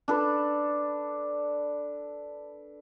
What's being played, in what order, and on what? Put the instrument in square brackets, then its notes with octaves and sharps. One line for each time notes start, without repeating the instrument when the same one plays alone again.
[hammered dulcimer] D4 A4 B4